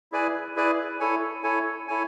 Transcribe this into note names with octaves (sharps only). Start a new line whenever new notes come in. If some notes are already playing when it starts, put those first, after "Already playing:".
E4 G#4 B4 D5 G#5
E4 G#4 B4 D5 G#5
E4 A4 C#5 G#5
E4 A4 C#5 G#5
E4 A4 C#5 G#5